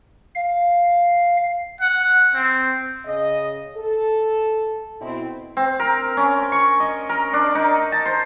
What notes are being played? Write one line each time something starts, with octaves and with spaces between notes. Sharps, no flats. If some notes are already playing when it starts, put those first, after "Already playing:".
F5
F#5
C4
C#3 D#5
A4
B2 C4 E4
C4
A#4
C#4
C#6
D#5
A#4
D4
D#4
A5
C5